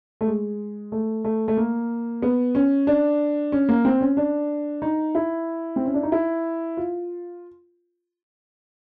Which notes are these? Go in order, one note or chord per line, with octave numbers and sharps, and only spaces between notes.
A3
G#3
A3
A3
A3
A#3
B3
C#4
D4
C#4
A#3
C4
C#4
D4
D#4
E4
C4
C#4
D4
D#4
E4
F4